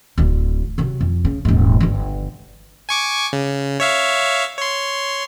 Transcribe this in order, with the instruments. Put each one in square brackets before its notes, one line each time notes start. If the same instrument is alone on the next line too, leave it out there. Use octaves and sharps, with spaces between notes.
[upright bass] D1 D3
C3 F#3
F2
C#3
D#1 G#2
G1 D3
[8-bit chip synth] G#5 C#6 D6
C#3
C#5 E5 F5
C#5 C6